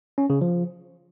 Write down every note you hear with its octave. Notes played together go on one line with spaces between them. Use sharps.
C#4
C#3
F3